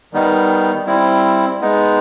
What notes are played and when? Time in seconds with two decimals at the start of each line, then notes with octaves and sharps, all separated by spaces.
0.13 D#3 G3 B3 D#4
0.86 G3 C4 E4
1.61 G#3 B3 D#4